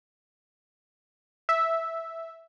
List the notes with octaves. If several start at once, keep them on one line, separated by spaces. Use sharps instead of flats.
E5